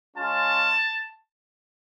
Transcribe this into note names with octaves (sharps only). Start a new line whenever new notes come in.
G#3 C#4 F4 A5